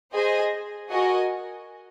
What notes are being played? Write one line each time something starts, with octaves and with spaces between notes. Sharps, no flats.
G#4 C5 D#5 G#5
F#4 A#4 D#5 G#5